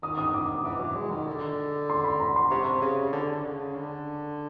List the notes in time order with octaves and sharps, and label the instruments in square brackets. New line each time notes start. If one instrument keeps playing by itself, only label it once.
[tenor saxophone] D#3 [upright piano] D#6
[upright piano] D#6
D6
[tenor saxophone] E3 [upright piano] D6
[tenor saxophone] F#3
G#3
D#3
D3
[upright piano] C6
B5
A#5
C6
[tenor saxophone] C3 [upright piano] C#6
[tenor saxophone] C#3
D3
D3
C#3
D3